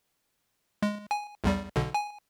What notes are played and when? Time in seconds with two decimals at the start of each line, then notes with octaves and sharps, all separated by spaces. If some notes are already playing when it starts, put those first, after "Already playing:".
0.82 G#3
1.11 G#5
1.44 B1 E2 G3
1.75 B1 B2 D3
1.94 G#5